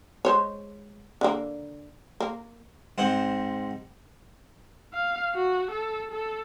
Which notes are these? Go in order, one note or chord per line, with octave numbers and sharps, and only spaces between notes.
G#3 C5 C#5
D3 A#3
A#3
G#2 C4 F#5
F5
F#4
A4
A4